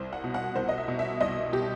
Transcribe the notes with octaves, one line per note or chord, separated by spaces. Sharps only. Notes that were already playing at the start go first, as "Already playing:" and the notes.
Already playing: C2 C5
F#5
B2
F#5
C2 C5
D#5
E5
B2
E5
C2 D#5
B2 G4